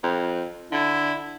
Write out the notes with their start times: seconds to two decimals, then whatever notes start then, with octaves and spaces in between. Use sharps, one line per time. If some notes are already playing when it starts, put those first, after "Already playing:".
0.04 F2
0.72 D3 E4